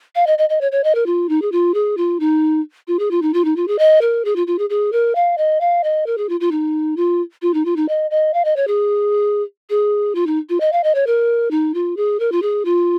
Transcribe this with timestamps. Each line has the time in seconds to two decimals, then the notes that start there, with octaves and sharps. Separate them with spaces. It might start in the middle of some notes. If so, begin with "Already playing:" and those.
0.15 F5
0.27 D#5
0.38 D#5
0.49 D#5
0.61 C#5
0.72 C#5
0.84 D#5
0.95 A#4
1.06 F4
1.29 D#4
1.42 G#4
1.52 F4
1.74 G#4
1.97 F4
2.20 D#4
2.88 F4
2.99 G#4
3.11 F4
3.22 D#4
3.34 F4
3.45 D#4
3.56 F4
3.68 G#4
3.79 D#5
4.01 A#4
4.25 G#4
4.36 F4
4.47 F4
4.59 G#4
4.70 G#4
4.92 A#4
5.15 F5
5.38 D#5
5.61 F5
5.84 D#5
6.06 A#4
6.18 G#4
6.29 F4
6.40 F4
6.51 D#4
6.97 F4
7.42 F4
7.54 D#4
7.65 F4
7.76 D#4
7.88 D#5
8.11 D#5
8.34 F5
8.45 D#5
8.56 C#5
8.67 G#4
9.70 G#4
10.15 F4
10.27 D#4
10.49 F4
10.60 D#5
10.72 F5
10.84 D#5
10.95 C#5
11.07 A#4
11.51 D#4
11.74 F4
11.97 G#4
12.20 A#4
12.32 F4
12.42 G#4
12.65 F4